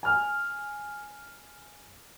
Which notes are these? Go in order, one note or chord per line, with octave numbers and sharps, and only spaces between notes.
G#5 F6